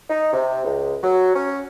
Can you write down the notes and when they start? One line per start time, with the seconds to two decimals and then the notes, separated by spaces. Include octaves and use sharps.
0.10 D#4
0.33 C3
0.65 C#2
1.03 F#3
1.35 C#4